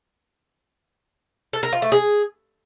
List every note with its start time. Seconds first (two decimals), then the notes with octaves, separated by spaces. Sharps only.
1.53 A4
1.63 A#4
1.73 F4
1.82 A3
1.92 G#4